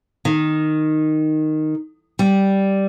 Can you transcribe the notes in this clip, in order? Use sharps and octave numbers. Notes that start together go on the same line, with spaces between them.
D#3
G3